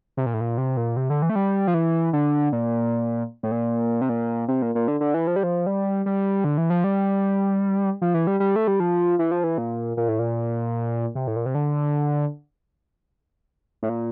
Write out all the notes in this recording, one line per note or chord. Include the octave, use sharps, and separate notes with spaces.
C3
A#2
A2
A#2
C3
A#2
C3
D3
E3
A3
G3
F3
E3
D3
A#2
A2
A#2
C3
A#2
C3
A#2
A#2
D3
D3
E3
F3
G3
F3
G3
G3
D3
E3
F3
G3
F3
E3
G3
G3
A3
G3
F3
E3
F3
E3
A#2
A#2
A2
A#2
C3
A2
A#2
C3
D3
A2
A#2